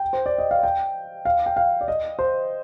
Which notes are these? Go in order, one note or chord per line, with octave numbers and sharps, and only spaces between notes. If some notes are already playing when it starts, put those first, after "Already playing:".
Already playing: G5
C5
D5
D#5
F5
G5
F5
G5
F5
D5
D#5
C5